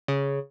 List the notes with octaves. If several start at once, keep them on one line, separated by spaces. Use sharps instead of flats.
C#3